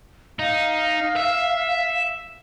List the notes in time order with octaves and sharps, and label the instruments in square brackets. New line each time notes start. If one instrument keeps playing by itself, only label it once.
[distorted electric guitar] D#4 [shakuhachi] F5
[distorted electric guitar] E5